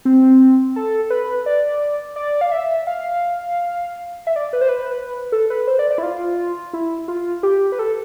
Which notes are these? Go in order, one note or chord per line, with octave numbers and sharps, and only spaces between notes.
C4
A4
B4
D5
D5
F5
E5
F5
E5
D5
B4
C5
B4
A4
B4
C5
D5
D5
E4
F4
E4
F4
G4
B4
A4